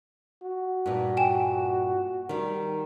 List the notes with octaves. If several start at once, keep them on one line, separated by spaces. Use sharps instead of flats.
F#4
G2 A#2
G5 G#5 E7
D#3 G3